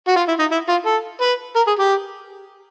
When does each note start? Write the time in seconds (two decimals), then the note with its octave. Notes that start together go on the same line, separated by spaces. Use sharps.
0.08 F#4
0.16 F4
0.28 E4
0.39 D#4
0.52 E4
0.69 F4
0.86 A4
1.21 B4
1.56 A#4
1.67 G#4
1.79 G4